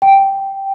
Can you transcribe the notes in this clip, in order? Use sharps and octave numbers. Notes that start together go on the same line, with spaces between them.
G5